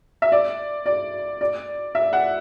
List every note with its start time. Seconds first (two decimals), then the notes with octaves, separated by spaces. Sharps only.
0.22 E5
0.32 D5
0.86 D5
1.41 D5
1.95 E5
2.13 F#5